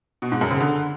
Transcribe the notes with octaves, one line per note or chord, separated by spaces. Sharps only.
B2
G#2
F#2
C#3
D3